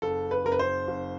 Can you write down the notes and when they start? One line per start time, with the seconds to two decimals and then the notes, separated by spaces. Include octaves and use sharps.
0.02 F#1 A4
0.31 B4
0.45 F#1 A#4
0.52 B4
0.59 C5
0.88 F#1